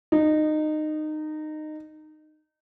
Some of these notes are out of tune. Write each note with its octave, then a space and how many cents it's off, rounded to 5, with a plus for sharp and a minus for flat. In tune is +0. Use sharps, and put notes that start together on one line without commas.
D#4 -20